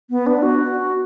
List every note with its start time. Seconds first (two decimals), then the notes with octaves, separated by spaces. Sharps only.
0.10 B3
0.27 D4
0.43 F#4